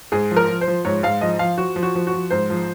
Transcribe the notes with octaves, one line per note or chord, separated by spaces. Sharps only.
G#2 G#4
F3
A#4
F3
C5
F3
G#2 C#5
G#2 F5
F3 D#5
F3 F5
F3 F#4
F3
F#4
F3
F#4
F3
G#2 C5
F3